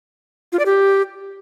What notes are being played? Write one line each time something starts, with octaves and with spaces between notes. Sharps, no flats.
F4
D5
G4